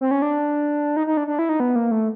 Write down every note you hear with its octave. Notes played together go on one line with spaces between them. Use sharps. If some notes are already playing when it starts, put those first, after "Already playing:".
C4
C#4
D4
D#4
D#4
D4
D4
E4
D#4
B3
A#3
A3